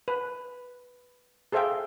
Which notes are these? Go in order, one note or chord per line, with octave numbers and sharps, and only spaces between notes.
B4
G#4 A4 C5 E5 F5 G5